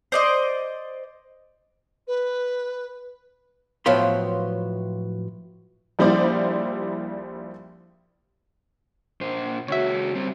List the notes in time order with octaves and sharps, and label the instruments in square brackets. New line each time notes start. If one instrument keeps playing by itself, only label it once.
[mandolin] C5 D5 D#5
[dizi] B4
[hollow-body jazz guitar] A2 F3 F#3 B3 F4 C6
[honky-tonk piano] A#1 F3 G3 E4 C5 D5
[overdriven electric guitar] A#2 C5
[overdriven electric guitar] C#2 F#4 [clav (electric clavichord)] C#5 E5
[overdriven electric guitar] G3 C4